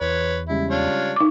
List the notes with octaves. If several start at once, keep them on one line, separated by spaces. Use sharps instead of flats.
E2 B4 C#5
C#3 G3 G#3 E4
D4 F4 C#5
D#4 D6